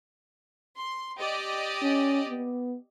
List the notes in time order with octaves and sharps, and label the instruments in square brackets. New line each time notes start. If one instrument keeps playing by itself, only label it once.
[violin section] C6
G4 D5 D#5
[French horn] C#4
B3